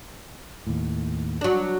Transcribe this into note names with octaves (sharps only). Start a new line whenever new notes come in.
D#2 A2
F#3 D4